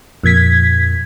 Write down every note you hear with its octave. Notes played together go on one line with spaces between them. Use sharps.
F2 A#2 G#6 B6